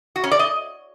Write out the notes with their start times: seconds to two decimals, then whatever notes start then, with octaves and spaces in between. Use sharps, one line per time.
0.16 F#4
0.24 C#4
0.31 D5
0.39 D#5